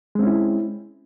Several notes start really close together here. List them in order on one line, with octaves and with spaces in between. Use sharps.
G#3 C4 C#4 E4